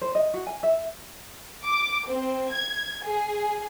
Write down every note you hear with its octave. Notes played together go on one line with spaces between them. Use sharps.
C5
D#5
F#4
G#5
E5
D6
C4
G#6
G#4